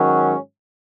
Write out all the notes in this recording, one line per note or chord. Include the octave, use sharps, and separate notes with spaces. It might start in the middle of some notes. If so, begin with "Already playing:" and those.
Already playing: G#2 D#3 F#3 C#4